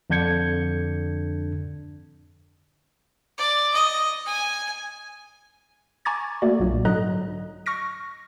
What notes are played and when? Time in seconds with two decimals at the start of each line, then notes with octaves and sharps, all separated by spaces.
0.10 F2 D3 D4 G6 G#6 C#7
3.38 D5
3.73 D#5
4.26 G#5
6.05 G#5 A#5 C#6 D6 G#6 A6
6.42 A3 A#3 F#4 D5
6.60 B1 G2 A#2 F#3
6.85 G#2 D3 F#3 D#5 A#5 F#6
7.66 C#6 F6 A#6 D7